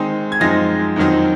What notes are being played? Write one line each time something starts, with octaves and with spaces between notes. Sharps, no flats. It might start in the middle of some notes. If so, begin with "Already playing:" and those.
Already playing: D#3 G#3 C4 D#4
G#6
F#2 F3 G#3 C4 D#4 A#6
F2 D#3 F#3 C4 D#4